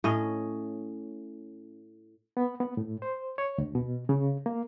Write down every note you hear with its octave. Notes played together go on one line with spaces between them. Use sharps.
A2 C#4 D#5
B3
B3
A2
C5
C#5
D2
B2
C#3
A#3